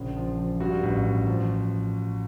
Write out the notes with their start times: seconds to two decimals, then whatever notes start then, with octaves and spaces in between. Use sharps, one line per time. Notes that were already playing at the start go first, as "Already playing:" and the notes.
Already playing: A#1 C#3 G#4
0.17 F3
0.39 F3
0.60 G2 F#4
0.83 A1
1.06 A1
1.27 F3